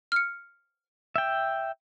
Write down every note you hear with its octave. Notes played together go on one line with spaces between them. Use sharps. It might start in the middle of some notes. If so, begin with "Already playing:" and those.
F6 C#7
E5 G5